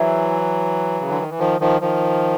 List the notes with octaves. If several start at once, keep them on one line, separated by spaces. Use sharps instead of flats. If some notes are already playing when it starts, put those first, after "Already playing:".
Already playing: E3 F#3 E4 G#4 C5
C#3
D3
D#3
E3
D#3 F3
D#3 F3
D#3 F3